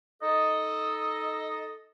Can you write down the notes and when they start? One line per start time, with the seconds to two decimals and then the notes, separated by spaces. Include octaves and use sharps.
0.23 D#4 A4 D#5